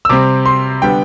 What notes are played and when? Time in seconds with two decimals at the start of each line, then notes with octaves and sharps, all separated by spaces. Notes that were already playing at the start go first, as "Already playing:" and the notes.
0.05 E6
0.09 C3 G3 C4 D6
0.46 C6
0.82 D3 G3 B3 G5